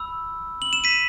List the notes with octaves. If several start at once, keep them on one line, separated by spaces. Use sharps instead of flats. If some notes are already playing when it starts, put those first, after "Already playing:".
Already playing: B5 E6
F#7
E7
B6 D#7